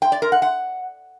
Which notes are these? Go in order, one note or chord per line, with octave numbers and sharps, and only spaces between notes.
G5
D5
A#4
F#5
F#5